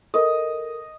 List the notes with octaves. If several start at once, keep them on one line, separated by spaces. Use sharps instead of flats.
A4 A#4 D#5